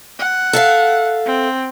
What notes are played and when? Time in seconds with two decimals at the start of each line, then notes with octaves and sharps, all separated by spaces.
0.19 F#5
0.53 A4 E5 F5
1.26 C4